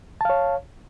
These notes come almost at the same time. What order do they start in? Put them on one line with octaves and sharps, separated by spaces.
A5 F5 C#5